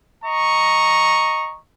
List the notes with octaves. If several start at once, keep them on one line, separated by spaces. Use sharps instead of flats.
D#5 A#5 C#6